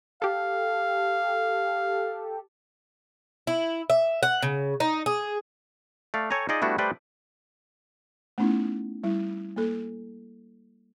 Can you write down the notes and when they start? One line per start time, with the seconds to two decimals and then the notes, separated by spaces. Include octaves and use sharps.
0.22 G4 A4 F5
3.47 E4
3.90 E5
4.23 F#5
4.43 C#3
4.80 D#4
5.06 G#4
6.14 A3 D5 F5
6.30 A4 C#5 G5 G#5 A#5
6.49 D#4 F4 G#4 D5 D#5
6.62 G3 A3 B3 D4 E4 F#4
6.78 G3 A3 B4 C5 D5 G5
8.38 A3 B3 C#4 D#4 E4
9.04 G3 E4
9.56 A#3 A4